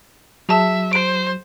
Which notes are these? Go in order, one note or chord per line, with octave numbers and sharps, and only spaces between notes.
F#3 G#4 E5 A5
C5 D7